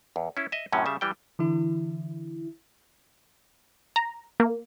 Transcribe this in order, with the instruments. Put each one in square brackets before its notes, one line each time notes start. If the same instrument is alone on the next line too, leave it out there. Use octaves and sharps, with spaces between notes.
[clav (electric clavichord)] E2
C#4 E4
D#5 E5
F#2 A2 C3 F#3 C#4
C#3 G3 E5
E3 G3 G5
[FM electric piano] D3 E3 E4
[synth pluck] A#5
A#3